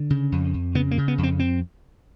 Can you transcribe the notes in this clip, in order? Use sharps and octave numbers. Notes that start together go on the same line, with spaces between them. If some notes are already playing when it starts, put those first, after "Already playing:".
Already playing: D3
C#3
F2
F2
C#3 B3
A#3
C#3
B3
F2
C4
C4